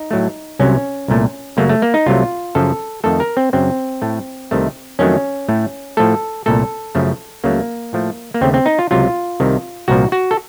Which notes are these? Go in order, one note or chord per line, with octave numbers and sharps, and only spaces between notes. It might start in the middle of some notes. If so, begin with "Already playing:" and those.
Already playing: D#4
A2 F#3 A3
C2 C3 F#3 C#4
C2 A#2 A3
F#2 C#3 F#3 A3 A#3
A3
A#3
D#4
C2 C3 F#3 A3 F4
F#2 C#3 F3 A4
F2 D#3 A3 A4
A#4
C4
F#2 C#3 F#3 C4
A2 A3
C2 C3 D#3 A3
F2 D#3 F#3 A3 C#4
A2 A3
A2 F3 A3 A4
C2 A#2 A3 A4
F#2 C#3 F3 A3
C#2 C#3 F#3 A3 A#3
A2 F3 A3
A#3
D#2 C#3 A3 C4
C4
D#4
F4
C#2 C3 F#3 F4
C2 C3 D#3
C2 A#2 F3 F#4
F#4
A4